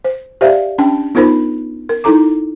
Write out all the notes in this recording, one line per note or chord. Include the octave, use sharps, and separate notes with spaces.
C5
G4 C5 D5 E5 F5
C#4 D4 G5 A5
B3 D#4 F4 A#4 C5 B5
A#4
D#4 E4 A4 A#5 D6